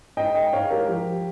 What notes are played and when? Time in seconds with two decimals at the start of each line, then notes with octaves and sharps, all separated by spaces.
0.17 G#2 D#5 G5
0.35 D#5 G5
0.53 G#2 C#5 F5
0.70 G4 A#4
0.88 F3 G4